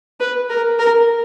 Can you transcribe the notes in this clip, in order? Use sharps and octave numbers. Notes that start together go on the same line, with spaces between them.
B4
A#4
A#4